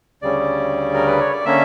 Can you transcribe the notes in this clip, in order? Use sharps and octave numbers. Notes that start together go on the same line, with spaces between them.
D2 C#3 G3 C#4 D5
A#4
B4
C#5
D5
D3 A#3 C#4 E5